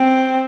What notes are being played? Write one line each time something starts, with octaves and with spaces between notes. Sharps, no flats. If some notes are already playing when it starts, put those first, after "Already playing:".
Already playing: C4